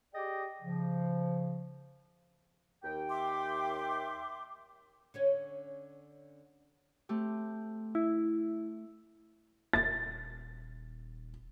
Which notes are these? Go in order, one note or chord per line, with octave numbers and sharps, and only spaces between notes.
G4 G#4 D5 D#5 G5
C#3 F3
D#2 G5
E5 C6 D6
D3 C#4 C#5
A3 C4 G4
E4
D#1 A6